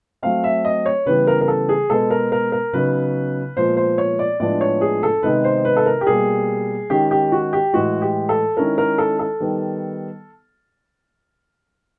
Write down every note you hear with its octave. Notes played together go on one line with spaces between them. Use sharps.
F#3 A3 C4 F5
E5
D#5
C#5
C#3 E3 G3 B3 B4
A#4
A#4
A4
G#4
B2 G#3 B3 A4
A#4
A#4
A#4
C#3 F#3 B3 D#4 B4
A#2 F3 G#3 B3 C5
C5
C#5
D5
A2 F3 G#3 B3 D4 D5
C#5
G#4
A4
C3 D#3 G#3 B3 D#4 B4
C5
B4
A4
A#4
G4
B2 G3 A#3 G#4
D#3 G#3 C#4 G4
G4
F#4
G4
A2 E3 G#3 F#4
G4
A4
D#3 G#3 C#4 E4 A#4
A#4
A4
A4
D#3 G3 B3